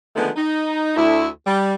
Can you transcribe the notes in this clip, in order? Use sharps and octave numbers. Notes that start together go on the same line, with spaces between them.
D3 D#3 F3 G#3 A3 B3
D#4
D2 E4
G3